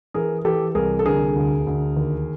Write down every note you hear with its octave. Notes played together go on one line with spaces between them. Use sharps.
E3 G#4 A#4
E3 G4 A4
C2 G#4 A#4
A4
D3 G#4 A#4
D2
D2
D#2